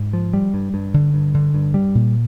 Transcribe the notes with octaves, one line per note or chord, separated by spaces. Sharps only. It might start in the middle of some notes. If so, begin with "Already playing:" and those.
Already playing: G#2
F3
G3
G2
G2
D3
G2
D3
G2
G3
A#2